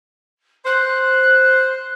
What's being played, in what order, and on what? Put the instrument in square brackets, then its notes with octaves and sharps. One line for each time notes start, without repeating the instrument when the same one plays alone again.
[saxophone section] C5 [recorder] F#6